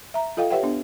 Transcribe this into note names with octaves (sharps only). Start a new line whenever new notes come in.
E5 A#5
F4 A4 D#5 F5 G5
G4 B4 C#5 E5 F#5 G5
B3 D4